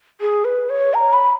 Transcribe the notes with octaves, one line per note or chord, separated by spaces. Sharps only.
G#4
B4
C#5
A#5
B5